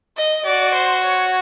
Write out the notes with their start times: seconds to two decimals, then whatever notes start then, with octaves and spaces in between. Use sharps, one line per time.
0.17 D#5
0.45 F#4 D5
0.75 C5
1.04 C#5